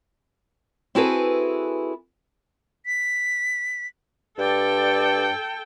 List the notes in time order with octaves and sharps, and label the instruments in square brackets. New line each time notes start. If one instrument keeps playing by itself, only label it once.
[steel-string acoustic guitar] C4 E4 F#4 G#4 A4 B4
[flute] B6
[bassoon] G2 [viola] A4 G5 [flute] D5